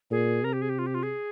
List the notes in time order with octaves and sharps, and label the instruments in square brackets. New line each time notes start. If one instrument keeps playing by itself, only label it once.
[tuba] A#2 [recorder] G#4
[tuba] C3 [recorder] A#4
[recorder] G4
G#4
G4
F4
G4
F4
G#4